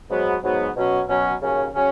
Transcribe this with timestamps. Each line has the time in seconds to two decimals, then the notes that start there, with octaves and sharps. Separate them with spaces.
0.10 G#2 F#3 B3
0.43 G#2 F#3 B3
0.76 B2 F#3 C#4
1.09 B2 F#3 C#4
1.41 D#2 C#3 F#3 C#4
1.74 C#3 F#3 C#4